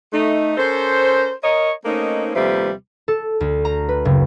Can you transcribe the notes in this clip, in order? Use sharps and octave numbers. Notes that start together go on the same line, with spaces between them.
A3 D#4
C#4 A4 A#4 C5
A#4 C#5 D#5
A3 A#3 C4 C#4 D#4
D#2 C3 F3 G3 A3 B4
A4
D2
A#5
B4
F#1